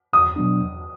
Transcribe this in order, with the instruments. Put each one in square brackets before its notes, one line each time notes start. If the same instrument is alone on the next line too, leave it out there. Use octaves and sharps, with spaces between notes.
[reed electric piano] E2 [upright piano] D#6
[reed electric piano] B2 F#3 B3 D4
E2